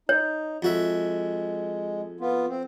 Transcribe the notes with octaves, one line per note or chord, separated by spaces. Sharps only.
D#4 C#5
F2 G#3 F#4 E5
B3 F4
C4